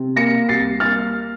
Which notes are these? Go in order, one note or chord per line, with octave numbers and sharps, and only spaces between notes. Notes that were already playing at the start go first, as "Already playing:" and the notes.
Already playing: C3
A#3 A#6 C#7
C2 A6 C7
A#3 F6 A6